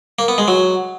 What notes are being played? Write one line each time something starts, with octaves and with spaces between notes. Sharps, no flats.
A#3
B3
G#3
F#3